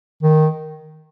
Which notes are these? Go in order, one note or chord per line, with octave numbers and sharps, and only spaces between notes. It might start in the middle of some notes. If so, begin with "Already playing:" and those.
D#3